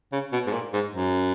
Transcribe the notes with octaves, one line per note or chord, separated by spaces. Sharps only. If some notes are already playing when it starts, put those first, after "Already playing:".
C#3
B2
G#2
A#2
G#2
F#2